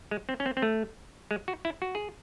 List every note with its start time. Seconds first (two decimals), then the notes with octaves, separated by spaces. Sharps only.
0.11 G#3
0.29 C4
0.40 C#4
0.46 C4
0.57 C4
0.62 A3
1.31 G#3
1.48 F#4
1.65 E4
1.82 F#4
1.95 G#4